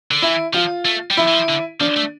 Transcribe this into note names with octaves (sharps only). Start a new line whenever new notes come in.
D3
E3 E4
F3 F4
A3
G3
F3 E4
E3
F3
D3
F3 D4
A3